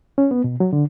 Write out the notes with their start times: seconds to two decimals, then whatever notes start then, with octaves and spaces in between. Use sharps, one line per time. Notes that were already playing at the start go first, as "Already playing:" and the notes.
0.18 C#4
0.31 B3
0.44 B2
0.60 F#3
0.73 D3